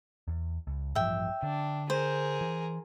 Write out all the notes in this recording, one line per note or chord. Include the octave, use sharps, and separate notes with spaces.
E2
C#2
A1 G2 F3 E5 G5
D3 D4
G#4 A#4 C5
E3